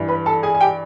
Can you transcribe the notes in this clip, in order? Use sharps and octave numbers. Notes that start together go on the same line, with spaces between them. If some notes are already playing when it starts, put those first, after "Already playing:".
Already playing: G2 E3
B4 B5
A4 A5
G#4 G#5
G#5
G4 G5